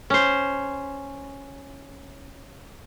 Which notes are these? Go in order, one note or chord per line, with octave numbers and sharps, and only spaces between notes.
C#4 C5